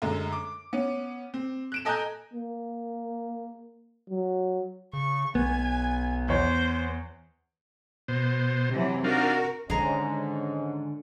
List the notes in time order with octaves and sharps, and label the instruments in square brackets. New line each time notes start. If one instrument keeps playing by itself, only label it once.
[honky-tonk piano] F#2 D3 G#3
D6
B3 C#4
C4
F#6 D7 E7
A4 D#5 G#5 A#5 F#6 G6
[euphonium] A#3
F#3
[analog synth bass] C#3 [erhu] C#6
[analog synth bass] B1 [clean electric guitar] B3 [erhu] G#5
[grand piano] E2 C#5 [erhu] C5
[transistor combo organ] B2 C5
[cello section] C3 E3 F#3
[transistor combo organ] D4 D#4 F5 [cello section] F#4 A#4
[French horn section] G#2 C#4 [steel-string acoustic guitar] D3 [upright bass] D#3 G#3 [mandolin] G#4 A#5